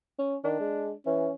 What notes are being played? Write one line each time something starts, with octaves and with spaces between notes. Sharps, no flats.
C#4
D#3 D4
G#3
E3 C#4